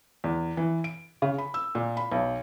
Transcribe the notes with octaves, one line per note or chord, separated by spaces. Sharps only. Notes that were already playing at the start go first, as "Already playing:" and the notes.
E2
E3
D7
C#3
B5
E6
A#2
B5
B1